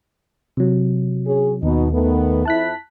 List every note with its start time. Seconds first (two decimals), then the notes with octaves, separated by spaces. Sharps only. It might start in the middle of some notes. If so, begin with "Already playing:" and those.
0.57 C3 F#3
1.27 C#4 G#4
1.63 D#2 B2 B3 D#4
1.91 D#3 A3 B3
2.45 F2 E4 A5 F#6 B6